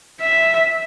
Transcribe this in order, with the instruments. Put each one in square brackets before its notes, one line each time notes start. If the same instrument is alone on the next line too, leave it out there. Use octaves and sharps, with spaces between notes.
[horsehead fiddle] E5